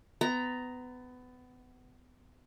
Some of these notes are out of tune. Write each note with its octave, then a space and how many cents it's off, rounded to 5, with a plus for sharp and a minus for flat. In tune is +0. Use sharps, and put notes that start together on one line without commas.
B3 +25 A#5 +0